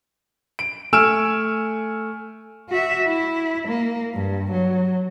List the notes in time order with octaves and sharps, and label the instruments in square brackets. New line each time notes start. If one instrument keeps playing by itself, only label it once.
[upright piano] D7
A3 G#5 E6 F6 D7 E7
[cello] F#4 E5
E4
A#3
G2
F#3